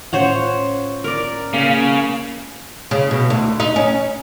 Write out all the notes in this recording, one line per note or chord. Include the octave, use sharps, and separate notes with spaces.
A2 C#4 F4 C5 C#5 F#5
A#4 D5
C#3 A#3 F5
C#3
B2
D2
D#4
C#4